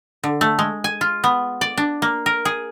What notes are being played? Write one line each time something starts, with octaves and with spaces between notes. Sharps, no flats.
D3
A3
G#3
G#5
F4
B3
D5
D4
A#3
A#4
G#4